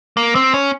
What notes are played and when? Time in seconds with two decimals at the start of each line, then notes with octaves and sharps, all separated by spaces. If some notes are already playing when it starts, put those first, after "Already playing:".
0.17 A#3
0.35 C4
0.54 C#4